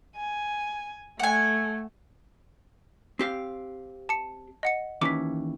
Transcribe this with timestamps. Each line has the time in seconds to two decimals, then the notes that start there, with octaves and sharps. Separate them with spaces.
0.16 G#5
1.20 A3 F#5 G#5
3.19 C4 G4 F5
4.09 A5 C#7
4.63 D#5 F#5 C#7
5.01 D#2 E3 C#4 D6 B6